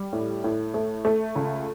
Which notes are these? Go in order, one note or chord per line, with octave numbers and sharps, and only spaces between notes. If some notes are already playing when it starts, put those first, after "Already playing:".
Already playing: G3
A2
A2
A3
A3
C#2